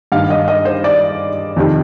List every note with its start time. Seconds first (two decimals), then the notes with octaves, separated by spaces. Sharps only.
0.12 G2 D#3 F5
0.30 D#5
0.48 D#5
0.65 C5
0.84 D5
1.56 F2 C3 D#3